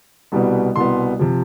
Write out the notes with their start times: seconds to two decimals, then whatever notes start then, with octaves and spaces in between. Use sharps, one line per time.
0.32 C2 B2 G3 B3
0.76 C2 B2 G3 B3 C6
1.19 C3 F3